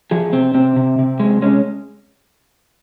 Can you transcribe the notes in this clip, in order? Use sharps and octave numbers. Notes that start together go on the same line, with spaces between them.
F3 G#4
C3 C4
C3 C4
C3
C3
G#3
G#3 C#4